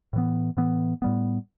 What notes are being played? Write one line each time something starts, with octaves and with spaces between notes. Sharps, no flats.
A2 E3 B3
A2 E3 B3
A2 G3 B3